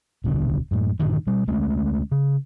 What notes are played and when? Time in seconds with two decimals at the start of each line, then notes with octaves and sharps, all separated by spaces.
0.24 D#1 C2 B2 D3
0.71 F#2 A2
1.00 G2 A#2 D3 D#3
1.27 B2 G3
1.48 D2 G#3 A3 C#4
2.12 C#3